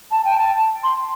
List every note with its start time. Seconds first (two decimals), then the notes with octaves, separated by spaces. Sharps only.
0.11 A5
0.25 G5
0.38 A5
0.84 C6